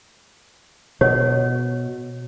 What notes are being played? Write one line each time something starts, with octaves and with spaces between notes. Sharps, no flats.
B2 C#5